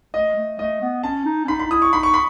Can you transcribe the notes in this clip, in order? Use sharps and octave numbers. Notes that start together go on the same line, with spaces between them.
A3 D#5
A3
A3 D#5
B3
C#4 A5
D#4
C#4
D#4 B5
B5
D#4
E4 D#6
C#6
D#4 B5
C#6
B5